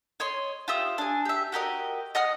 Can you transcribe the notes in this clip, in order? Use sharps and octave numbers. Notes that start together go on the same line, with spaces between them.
C#5 D#5 C6
F4 G4 E5 D#6
D4 G#5
G4 E5
F#4 G4 A#4 D#5
D#5 F#5 D#6 F6